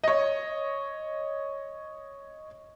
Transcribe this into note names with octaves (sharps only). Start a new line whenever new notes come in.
C#5 D#5